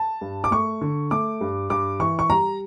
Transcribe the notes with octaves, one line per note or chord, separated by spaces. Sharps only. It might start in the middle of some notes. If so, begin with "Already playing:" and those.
Already playing: A5
G2
D6
A3 C#6
D3
A3 D6
G2
G2 D6
E3 C#6
C#6
G3 A#5